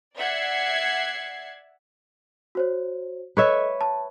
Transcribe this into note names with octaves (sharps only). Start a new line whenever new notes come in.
D5 E5 F#5 G#6 C7 C#7
F#4 C5 C#5
A4 B4 C#5 D#5 E5
A5